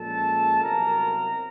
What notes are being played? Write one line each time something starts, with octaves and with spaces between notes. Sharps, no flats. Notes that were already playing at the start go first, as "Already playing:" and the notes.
Already playing: A#2 F3 G#3 C#4 A4 A5
C2 B2 F#3 A#4 A#5